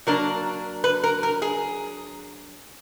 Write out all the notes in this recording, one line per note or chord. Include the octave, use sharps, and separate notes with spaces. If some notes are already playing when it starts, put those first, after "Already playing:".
F#3 A#3 D4 A#4
B4
A#4
A#4
G#4